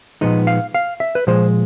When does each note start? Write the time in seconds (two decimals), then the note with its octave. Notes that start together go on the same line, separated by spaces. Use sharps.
0.21 A#2 F3 G#3 B3 D#4 D#5
0.47 F5
0.74 F5
1.00 E5
1.15 B4
1.27 A#2 F3 G#3 C5